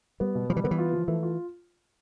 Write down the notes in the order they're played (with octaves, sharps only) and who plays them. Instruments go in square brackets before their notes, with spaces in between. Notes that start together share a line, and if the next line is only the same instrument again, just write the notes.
[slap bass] G3 [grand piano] B3
[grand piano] B2
[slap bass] F3 [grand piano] G3
[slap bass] E3
[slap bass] D3 [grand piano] B3
[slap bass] E3
[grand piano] F4
F3
[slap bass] E3 [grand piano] A3
[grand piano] F4